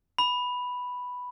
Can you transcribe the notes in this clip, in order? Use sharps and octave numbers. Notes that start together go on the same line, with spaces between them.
B5